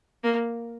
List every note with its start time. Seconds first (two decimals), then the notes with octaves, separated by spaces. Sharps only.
0.24 A#3